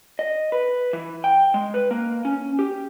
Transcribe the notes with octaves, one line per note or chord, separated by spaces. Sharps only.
D#5
B4
E3
G5
G#3
B4
A#3
C#4
G4